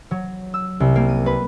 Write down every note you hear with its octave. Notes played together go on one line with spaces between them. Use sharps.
F#3
E6
C2
A#3
D#7
B4